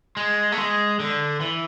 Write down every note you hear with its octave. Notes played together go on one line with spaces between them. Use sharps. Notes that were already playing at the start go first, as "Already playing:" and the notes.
G#3
A3
G#3
D3
E3